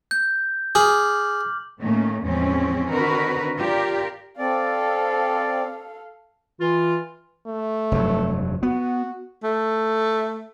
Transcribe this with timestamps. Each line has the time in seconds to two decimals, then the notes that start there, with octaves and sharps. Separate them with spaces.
0.11 G6
0.75 G#4 D6 F6 F#7
1.82 A2 D#3 A3 A#3 C#4
2.23 E2 A2 F3 G#3 C4 C#4
2.89 D3 D#3 C4 F#4 A#4 B4
3.56 F4 G4 A#4 D5
4.39 C4 A4 D5 F5
6.61 E3 F4
7.47 A3
7.92 F1 G2 F#3
8.63 B3 F#4
9.44 A3